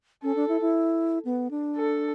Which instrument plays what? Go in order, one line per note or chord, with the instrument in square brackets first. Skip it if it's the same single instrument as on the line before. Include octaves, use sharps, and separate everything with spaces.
[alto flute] C#4 [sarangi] A4
[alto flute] D4
E4
E4
B3
D4
[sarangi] A4